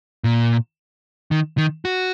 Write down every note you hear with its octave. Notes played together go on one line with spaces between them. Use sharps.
A#2
D#3
D#3
F#4